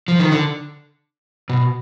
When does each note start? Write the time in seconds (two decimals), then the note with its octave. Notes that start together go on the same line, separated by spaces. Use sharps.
0.08 F3
0.19 D#3
0.31 D3
1.49 B2